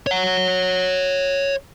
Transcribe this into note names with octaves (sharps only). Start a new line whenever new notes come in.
C#5 F#5